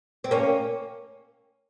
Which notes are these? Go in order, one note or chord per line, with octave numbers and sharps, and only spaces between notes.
C4
A#3 C#4